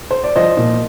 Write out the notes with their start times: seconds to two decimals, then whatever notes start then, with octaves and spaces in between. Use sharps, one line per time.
0.11 C5
0.24 D5
0.36 F3 C5 D#5
0.57 A#2